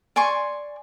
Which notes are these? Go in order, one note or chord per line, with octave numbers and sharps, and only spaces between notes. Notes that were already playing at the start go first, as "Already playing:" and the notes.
D5 G#5 C6 C#6